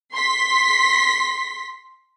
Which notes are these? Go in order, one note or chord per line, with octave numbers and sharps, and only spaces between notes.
C6 B6